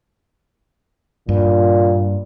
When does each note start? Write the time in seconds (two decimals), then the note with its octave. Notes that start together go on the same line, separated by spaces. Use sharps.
1.29 G2 A#2